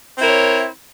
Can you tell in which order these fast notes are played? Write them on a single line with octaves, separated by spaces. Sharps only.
C4 E4 A#4 C#5